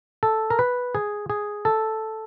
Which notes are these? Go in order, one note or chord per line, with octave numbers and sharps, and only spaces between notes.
A4
A#4
B4
G#4
G#4
A4